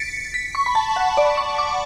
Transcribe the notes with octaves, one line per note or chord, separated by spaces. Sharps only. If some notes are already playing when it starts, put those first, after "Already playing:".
Already playing: A6 B6 C#7 D7
B6
C#6
B5
A5
F#5
D5
C#6
D6